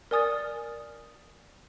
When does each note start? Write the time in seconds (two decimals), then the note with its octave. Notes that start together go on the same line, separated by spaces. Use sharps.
0.11 A#4 D5 G#5 D#6 F6 A6